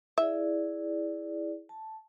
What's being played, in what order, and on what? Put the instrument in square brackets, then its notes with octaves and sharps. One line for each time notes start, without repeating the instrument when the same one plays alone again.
[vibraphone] E4 G#4 D5 [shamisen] E5
[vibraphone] A5